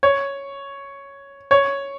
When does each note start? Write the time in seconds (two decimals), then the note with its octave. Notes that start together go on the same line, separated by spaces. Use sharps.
0.03 C#5
1.51 C#5